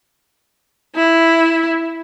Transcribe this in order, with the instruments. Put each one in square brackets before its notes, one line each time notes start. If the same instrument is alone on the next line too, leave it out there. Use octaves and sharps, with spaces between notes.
[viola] E4